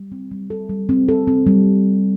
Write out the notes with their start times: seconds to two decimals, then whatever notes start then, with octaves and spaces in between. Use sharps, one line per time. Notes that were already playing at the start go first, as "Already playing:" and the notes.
Already playing: G3
0.12 C4
0.31 G3
0.50 A4
0.69 G3
0.89 C4
1.08 A4
1.27 C4
1.47 G3